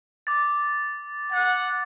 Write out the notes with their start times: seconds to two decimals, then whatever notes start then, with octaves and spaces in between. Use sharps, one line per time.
0.27 D6 A6
1.32 F#5 A6